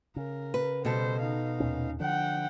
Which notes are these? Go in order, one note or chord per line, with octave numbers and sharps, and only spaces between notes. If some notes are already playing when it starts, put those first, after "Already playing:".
C#3 A#4
B4
B2 G3 A4 C5
D#4 F5
D#2 A#2 C#4
D3 F3 D4 F#5 G5